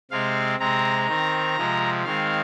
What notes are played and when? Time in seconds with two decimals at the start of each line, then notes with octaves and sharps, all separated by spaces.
0.11 C3 G#3 C4 F5
0.60 C3 G#3 C4 A#5
1.08 D#3 C4
1.56 C3 F3 G#3
2.04 D#3 G#3 C4 F5